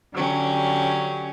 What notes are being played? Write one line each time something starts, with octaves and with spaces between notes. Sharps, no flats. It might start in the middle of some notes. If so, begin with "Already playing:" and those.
D3 F#3 C#4 G4